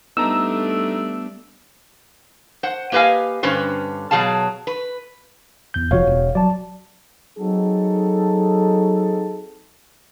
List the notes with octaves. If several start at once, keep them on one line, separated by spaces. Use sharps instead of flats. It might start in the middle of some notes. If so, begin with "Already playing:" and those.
G3 A3 B3 D4 D#4 A4 A#5 E6
C5 F#5
A#3 G4 B4 D#5 F5 G#5
G2 D3 C#4 B4 C5
B2 F#3 G3 G#4 F5 A5
B4
E2 G6
F1 A2 F3 F#4 C#5 F5
E1
F#3 D5 A5
F#3 C4 D#4 F#4 G#4 A4